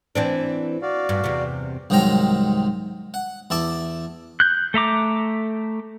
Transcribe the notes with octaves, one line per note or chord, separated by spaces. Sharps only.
E3 C4 D4
F#4 D5 F5
G2
E2 C3
C2 G#2 D#3 F#3 G5 A#5
F#5
E2 E4 A5 D6
F#6 G6
A3 E5 A#5 D6